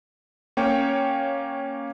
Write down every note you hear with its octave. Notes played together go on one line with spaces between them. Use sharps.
A#3 C#4 C#5 G5